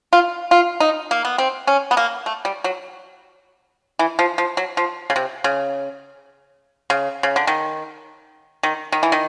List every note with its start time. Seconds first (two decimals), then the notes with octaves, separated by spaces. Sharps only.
0.13 F4
0.51 F4
0.80 D#4
1.11 A#3
1.25 B3
1.38 C4
1.67 C#4
1.91 B3
1.97 A#3
2.26 A3
2.45 G3
2.64 F#3
3.99 E3
4.19 F3
4.38 F3
4.57 F#3
4.77 F3
5.10 C#3
5.16 C3
5.44 C#3
6.90 C#3
7.23 C#3
7.36 D3
7.47 D#3
8.63 D#3
8.92 D#3
9.03 E3
9.12 D#3